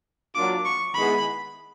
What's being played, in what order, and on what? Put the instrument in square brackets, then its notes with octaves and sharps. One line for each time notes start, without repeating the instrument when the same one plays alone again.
[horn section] F#3 A#3 D4 F4 [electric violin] D6
[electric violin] C#6
[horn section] D#3 G#3 B3 E4 G#4 [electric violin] B5